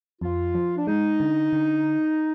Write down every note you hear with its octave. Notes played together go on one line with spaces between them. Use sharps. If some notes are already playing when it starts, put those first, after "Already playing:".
F2 F4
F3
D4
G#3 D#4
D3
D3